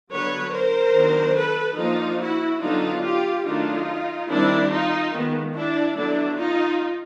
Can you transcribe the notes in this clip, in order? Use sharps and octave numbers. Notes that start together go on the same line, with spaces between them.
D3 F#3 B3 D4 B4 C#5
A#4 C5
D#3 F#3 B3 D4
A4 B4
F3 A#3 D4 D#4 F4
E4 F#4
D3 F#3 B3 D4 D#4 F4
F4 G4
D#3 F#3 A3 D4 D#4 F4
D#3 G3 C4 D4 E4
D#4 F4
D#3 G#3 B3
D4 E4
D3 F#3 B3 D4 E4
D#4 F4